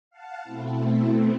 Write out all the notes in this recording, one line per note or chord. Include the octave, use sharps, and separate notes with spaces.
F5 F#5 A5
B2 A3 C4 E4